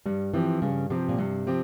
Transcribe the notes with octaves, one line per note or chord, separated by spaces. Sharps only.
G2 G3
E3 F3 C4 G4
G2 C#3
C3 F3 C4 G4
A#2
G2 C3
F3 C4 G4